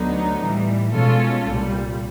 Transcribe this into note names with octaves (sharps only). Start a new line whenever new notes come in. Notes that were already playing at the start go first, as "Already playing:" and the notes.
Already playing: D2 D3 F#3 B3 D#4
A2 E3 G3
B2 G#3 C#4 F4 A4
C2 A#2 G3